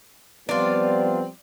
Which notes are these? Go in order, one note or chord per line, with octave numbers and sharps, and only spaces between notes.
F3 G3 B3 C4 D4 F4 D5